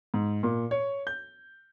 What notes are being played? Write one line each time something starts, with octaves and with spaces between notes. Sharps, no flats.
G#2
A#2
C#5
G6